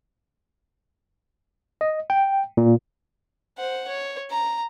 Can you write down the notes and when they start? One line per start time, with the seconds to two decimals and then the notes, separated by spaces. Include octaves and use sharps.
1.81 D#5
2.10 G5
2.57 A#2
3.58 C5 F#5
3.88 C#5
4.31 A#5